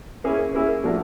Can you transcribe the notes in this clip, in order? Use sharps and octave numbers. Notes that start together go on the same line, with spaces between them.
A#3 C#4 E4 G#4
A#3 C#4 E4 G#4
F3 A3 D4 F#4 A#4